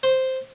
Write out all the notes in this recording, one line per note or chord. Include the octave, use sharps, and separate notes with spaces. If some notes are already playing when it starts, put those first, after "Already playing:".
C5